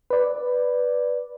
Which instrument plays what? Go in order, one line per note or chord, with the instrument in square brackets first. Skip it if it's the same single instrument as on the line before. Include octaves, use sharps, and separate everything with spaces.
[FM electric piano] B4 D5